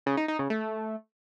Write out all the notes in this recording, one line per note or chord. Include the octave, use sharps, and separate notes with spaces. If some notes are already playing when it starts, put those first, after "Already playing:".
C#3
D#4
D#4
C#3
A3